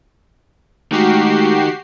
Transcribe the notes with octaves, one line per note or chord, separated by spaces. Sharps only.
D#3 G#3 A3 F#4 G4 F#5 C7